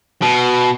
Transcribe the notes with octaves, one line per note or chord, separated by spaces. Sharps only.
B2